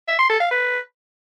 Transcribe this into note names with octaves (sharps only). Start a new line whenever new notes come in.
E5
C6
A4
F5
B4